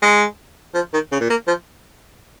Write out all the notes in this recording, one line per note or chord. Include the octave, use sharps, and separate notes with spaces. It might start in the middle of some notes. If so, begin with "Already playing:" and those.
G#3
F3
D#3
C#3
A#2
A#3
F3